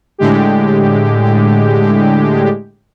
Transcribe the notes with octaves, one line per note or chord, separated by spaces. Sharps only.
A2 D3 G#3 G4